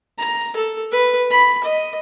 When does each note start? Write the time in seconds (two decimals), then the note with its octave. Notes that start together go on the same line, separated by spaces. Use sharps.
0.18 A#5
0.56 A4
0.92 B4
1.31 B5
1.64 D#5